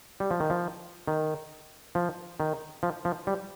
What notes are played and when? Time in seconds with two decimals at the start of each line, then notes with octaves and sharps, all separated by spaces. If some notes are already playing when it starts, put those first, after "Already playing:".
0.20 G3
0.31 F3
0.40 D#3
0.50 F3
1.07 D#3
1.95 F3
2.40 D#3
2.83 F3
3.05 F3
3.27 G3